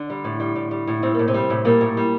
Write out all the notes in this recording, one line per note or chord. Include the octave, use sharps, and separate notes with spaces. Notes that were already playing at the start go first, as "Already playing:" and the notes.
Already playing: D3 D4
G3
A2
G3
A2
G3
A2
G3 C4
A2 A#3
C3 C4
G3
A2
A#2 G3 A#3
A2
G3